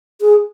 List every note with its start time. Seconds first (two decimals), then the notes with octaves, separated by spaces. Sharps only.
0.21 G#4